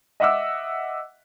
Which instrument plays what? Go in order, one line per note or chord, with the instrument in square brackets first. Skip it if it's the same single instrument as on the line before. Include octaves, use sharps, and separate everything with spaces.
[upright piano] D#5 E5 F#5 D6 E6